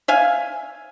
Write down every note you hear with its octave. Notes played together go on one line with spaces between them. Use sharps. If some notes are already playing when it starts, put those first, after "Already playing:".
E5 F5 G#5